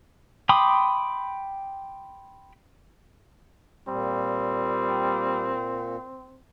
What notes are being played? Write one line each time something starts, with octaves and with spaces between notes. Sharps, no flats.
G5 B5 C6 D6 D#6
A#2 G3 C4